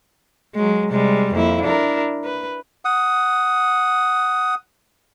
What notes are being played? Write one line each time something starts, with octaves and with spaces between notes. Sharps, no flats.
F#3 G#3
C3 G3 G#3
F2 A#3 E4
D4 E4 A#4
B4
F#5 D#6